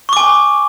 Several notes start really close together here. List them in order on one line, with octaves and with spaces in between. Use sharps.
C#6 D6 G#5